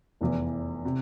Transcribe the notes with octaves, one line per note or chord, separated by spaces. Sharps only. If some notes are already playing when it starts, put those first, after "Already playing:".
F1 E2 E3
C3